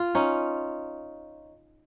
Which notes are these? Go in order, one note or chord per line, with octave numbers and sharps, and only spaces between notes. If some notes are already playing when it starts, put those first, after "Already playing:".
Already playing: F4
C#4 D#4